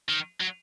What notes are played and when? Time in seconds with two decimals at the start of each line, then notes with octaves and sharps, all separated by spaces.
0.09 D#3
0.41 F#3